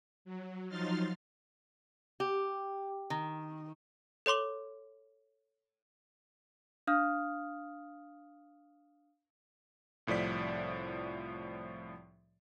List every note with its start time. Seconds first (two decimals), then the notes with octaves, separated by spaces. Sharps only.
0.25 F#3
0.69 F3 F#3 D#4 C6 F6 A6
2.20 G4
3.10 D#3
4.26 A4 C#5 C6 D6 G7
6.87 D4 F5 D#6 F6
10.07 C2 A2 F3 D5 B6